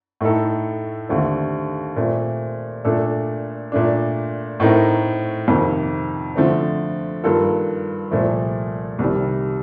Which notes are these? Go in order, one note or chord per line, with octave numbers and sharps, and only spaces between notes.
A2 A3 D#4 A4
D#2 D3 A3 C4
A#2 A3 C4
A#2 A3 D4 A4
A#2 A3 D4
A2 A3 C4 D#4 A#4
F2 C3 D#3
D3 F3 A3 C4
G2 D#3 A#3 F4 A4
C2 A#2 F3 A3
C2 C3 D#3 G3